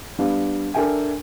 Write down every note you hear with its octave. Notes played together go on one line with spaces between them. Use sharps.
G3 B3 D4 F5
D4 A4 A#4 E5 G5 G#5